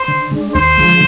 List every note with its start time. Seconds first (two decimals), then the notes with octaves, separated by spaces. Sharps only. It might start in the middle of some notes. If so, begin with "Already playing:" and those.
Already playing: C5
0.08 D3
0.32 G#3 D4
0.54 D#2 C5
0.78 D3 F3 G#3